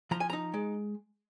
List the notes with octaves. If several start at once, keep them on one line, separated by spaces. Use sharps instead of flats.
F3 A#5
G#5
D#4 A#5
G#3